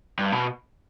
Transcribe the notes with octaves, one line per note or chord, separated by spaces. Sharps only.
G2
B2